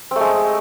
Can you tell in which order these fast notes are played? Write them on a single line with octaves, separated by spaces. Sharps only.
C4 A3 G#3